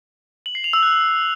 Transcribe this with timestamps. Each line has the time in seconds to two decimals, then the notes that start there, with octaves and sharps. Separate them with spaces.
0.46 F#7
0.55 C7
0.64 F7
0.73 E6
0.83 F#6